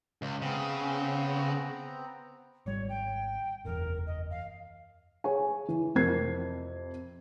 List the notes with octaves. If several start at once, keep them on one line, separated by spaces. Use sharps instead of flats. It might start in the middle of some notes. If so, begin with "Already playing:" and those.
C#2
C#3 B3 C4 A#5
G#1 G3 C#5
G5
F#1 E2 A#4
D#5
F5
G#4 C#5 G#5
E3
F2 C3 C4 A#4 G#6 C7